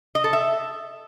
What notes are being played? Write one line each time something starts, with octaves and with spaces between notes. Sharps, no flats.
D#5
A4
E5